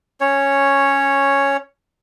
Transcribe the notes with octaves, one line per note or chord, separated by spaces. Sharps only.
C#4 C#5